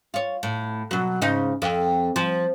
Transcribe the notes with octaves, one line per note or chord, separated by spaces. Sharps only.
F4 C#5
A2
B2 F#3
G#2 C#3 D#4
F2
F3